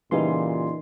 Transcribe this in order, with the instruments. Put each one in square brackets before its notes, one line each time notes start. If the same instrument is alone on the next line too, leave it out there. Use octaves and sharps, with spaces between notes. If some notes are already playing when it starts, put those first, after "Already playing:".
[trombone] A#2 [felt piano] C#3 E3 G3 [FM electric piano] D#4 F4 C6